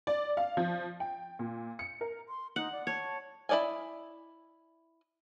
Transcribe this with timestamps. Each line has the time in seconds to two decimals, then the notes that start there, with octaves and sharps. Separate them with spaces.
0.07 D5
0.37 F5
0.57 F3
1.00 G5
1.39 A#2
1.79 C#7
2.01 A#4
2.28 C6
2.56 D#4 F#5
2.72 D5
2.87 C#5 A5
3.49 E4 G#4 D5 D#5 G#5